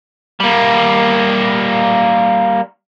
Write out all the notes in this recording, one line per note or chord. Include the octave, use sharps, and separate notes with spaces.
G3 A#3